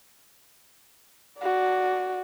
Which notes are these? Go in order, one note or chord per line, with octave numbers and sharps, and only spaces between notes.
F#4 D5